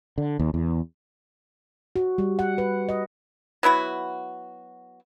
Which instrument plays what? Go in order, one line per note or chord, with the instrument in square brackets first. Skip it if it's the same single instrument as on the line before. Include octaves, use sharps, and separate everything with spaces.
[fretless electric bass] D3
D#2
E2
[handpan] F#4
G3
F#5
B4
D#5
[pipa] F#3 B3 E4 F#4